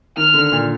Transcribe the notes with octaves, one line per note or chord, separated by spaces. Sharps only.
D#3 F6
D3
A#2